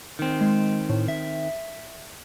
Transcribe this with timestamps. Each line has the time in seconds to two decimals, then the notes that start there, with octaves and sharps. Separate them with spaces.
0.19 D#3 C4
0.41 G#3
0.89 A2
1.08 E5